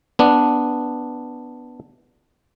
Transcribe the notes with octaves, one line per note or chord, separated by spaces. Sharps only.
B3 D4